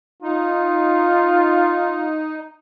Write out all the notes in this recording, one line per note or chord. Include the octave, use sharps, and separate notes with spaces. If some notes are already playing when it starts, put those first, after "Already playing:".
D#4 F4